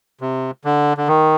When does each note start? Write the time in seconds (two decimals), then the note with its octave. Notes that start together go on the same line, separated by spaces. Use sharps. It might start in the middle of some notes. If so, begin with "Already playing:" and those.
0.21 C3
0.65 D3
0.97 D3
1.08 D#3